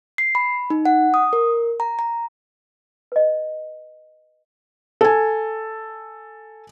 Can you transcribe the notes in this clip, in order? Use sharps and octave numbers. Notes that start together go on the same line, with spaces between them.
C7
B5
D#4
F#5
D#6
A#4
A#5
A#5
B4 D#5
A4 G#5